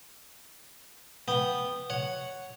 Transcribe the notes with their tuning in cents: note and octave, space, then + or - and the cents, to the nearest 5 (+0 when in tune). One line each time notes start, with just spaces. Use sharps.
B3 +0 G5 +0
C#5 +0 F#5 +0